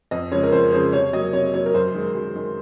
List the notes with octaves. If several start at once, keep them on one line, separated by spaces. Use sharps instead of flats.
F2 D#5
C#3 F3 G#3 C#5
A#4
F2 C5
C#3 F3 G#3 C5
C3 C#5
F#3 A#3 D#5
C3 C#5
F#3 A#3 C#5
A#4
F#2 C5
D#3 G#3
F#2
D#3 G#3